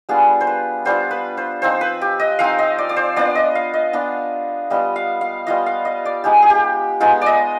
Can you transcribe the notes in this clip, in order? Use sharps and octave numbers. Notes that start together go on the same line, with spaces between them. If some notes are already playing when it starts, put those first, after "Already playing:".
G3 B3 D4 F4 G#4
C5
B4
G3 B3 D4 F4 C5
B4
C5
F3 C4 D#4 C5
B4
G4
D#5
F3 C4 D#4 F5
D#5
D5
D5
C5
B3 D4 F4 D5
D#5
F5
D#5
B3 D4 F4
G3 B3 F4 D#5
F5
F5
G3 B3 F4 D#5
F5
D#5
D5
G#3 B3 D#4 G4
G#4
G4
G#3 B3 D#4 F4
D5 D#5